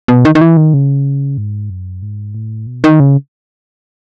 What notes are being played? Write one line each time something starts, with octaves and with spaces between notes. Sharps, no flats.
B2
D#3
D#3
E3
D#3
C#3
G#2
F#2
G#2
A2
B2
D#3
C#3